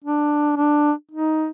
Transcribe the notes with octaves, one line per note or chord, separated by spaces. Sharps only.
D4
D4
D#4